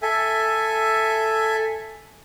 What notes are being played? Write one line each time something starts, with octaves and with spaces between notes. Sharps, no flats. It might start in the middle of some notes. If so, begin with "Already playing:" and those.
A4 E5 G#5